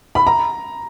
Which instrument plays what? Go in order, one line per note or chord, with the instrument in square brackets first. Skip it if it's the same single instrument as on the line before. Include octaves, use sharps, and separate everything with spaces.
[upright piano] B5
A#5